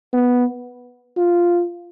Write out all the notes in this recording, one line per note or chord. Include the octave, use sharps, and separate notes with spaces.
B3
F4